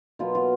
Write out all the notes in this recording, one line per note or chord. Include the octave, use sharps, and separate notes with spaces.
B2 F#3 B3 F4
F4